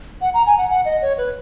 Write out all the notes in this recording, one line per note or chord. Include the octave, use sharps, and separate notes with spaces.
F#5
A#5
G#5
F#5
F#5
D#5
C#5
B4